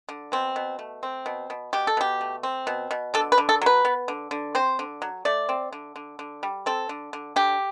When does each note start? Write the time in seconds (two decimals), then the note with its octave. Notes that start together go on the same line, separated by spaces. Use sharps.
0.09 D3
0.32 B2 C4
0.56 B2
0.79 A3
1.03 C4
1.26 B2
1.50 B2
1.73 B2 G4
1.87 A4
1.97 B2 G4
2.21 A3
2.43 C4
2.67 B2
2.91 B2
3.14 D3 A4
3.32 B4
3.38 D3
3.49 A4
3.62 F#3 B4
3.85 B3
4.08 D3
4.31 D3
4.55 C4 C5
4.79 D3
5.02 F#3
5.25 A3 D5
5.49 C4
5.72 D3
5.96 D3
6.19 D3
6.43 G3
6.66 C4 A4
6.89 D3
7.13 D3
7.36 D3 G4